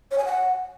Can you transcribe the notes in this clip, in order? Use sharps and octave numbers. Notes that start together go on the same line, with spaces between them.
C#5
G#5
F#5